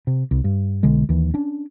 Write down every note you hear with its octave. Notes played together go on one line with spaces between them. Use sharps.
C3
C2
G2
B1 D3 G#3
D#2 E3
C#4 D4